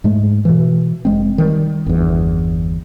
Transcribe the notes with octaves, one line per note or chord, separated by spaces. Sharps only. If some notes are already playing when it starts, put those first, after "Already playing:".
G#2 G#3 A3
B2 E3
F1 G#3 C4
D#3 G3
G1 E2